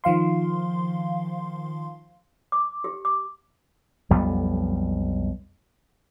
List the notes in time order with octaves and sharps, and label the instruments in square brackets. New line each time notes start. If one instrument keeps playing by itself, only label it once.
[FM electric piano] D#3 F3 F5 C6
[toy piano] D6
G4
D6
[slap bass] B1 F2 G3 B3